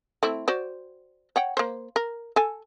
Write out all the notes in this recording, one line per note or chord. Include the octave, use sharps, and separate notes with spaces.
A3 C4 E4
F#4 C5 D5
C#5 F#5 G5
A#3 C5
A#4
A4 G#5